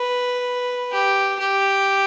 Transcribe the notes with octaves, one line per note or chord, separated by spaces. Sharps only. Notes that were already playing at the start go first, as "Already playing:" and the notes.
Already playing: B4
G4
G4